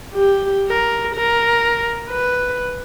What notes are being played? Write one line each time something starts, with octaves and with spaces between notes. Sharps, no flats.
G4
A#4
A#4
B4